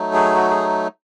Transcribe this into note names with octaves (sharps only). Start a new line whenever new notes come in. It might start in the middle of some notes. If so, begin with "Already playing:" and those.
Already playing: F#3 A3 D#4
G#4
F#4
G#4